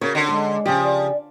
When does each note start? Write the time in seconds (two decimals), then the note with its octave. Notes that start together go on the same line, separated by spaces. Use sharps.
0.01 C#3 F#4 A#4 C#5
0.15 D3
0.29 G#3 A4
0.66 C#3 F3 G4
0.84 D5